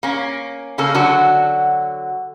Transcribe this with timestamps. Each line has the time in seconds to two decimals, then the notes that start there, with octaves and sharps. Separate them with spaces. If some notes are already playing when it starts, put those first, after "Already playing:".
0.03 A#3 C#4
0.78 C#3 A#3 C#4 A4
0.95 D3 F#3 F#4 A5